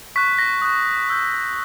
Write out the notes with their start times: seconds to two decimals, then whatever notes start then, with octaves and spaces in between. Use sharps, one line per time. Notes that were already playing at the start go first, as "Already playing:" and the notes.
0.16 C#6 F#6 B6
0.38 A#6
0.62 D#6 F#6
1.08 C#6 E6 G6